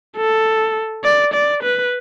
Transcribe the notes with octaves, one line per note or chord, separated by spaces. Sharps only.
A4
D5
D5
B4